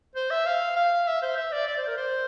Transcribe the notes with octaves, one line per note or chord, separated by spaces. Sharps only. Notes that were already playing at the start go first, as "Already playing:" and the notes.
C5
E5
F5
F5
E5
C5
E5
D5
D5
C5
A#4
C5